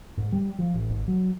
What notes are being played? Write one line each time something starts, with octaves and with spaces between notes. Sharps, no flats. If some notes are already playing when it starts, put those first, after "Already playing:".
G#2
G3
F3
A1
G#1
F#3